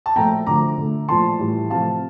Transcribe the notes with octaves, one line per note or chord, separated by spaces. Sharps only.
A5
A#2 F3 A3 G5 A#5
D3 F3 A3 A#5 D6
D3 A3
A#2 F3 A3 A5 C6
A2 E3 G3
C3 F3 A3 F5 A5